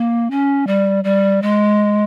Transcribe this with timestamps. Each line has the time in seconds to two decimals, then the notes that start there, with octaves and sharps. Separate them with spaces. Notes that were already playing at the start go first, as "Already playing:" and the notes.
Already playing: A#3
0.31 C#4
0.67 G3
1.04 G3
1.42 G#3